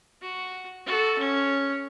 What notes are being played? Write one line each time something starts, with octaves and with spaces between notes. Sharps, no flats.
F#4
F#4 A4
C#4